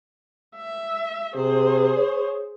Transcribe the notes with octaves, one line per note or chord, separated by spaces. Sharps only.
E5
C3 G#4 C5
C#5